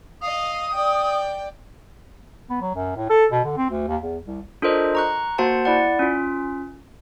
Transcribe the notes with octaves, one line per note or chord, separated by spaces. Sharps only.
D#5 F5 D#6
D5 G5
B3
F#3
F#2
A2
A4
B2
D3
C4
D2
D#2
E2
C2
D4 F4 A4 A#4 C5 D#5
A#5 C#6 F#6
A#3 F#4 C5 F#5 A5
E4 D5 F#5
C#4 F4